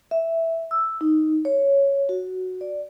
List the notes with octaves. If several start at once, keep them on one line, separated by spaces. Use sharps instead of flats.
E5
E6
D#4
C#5
F#4
D5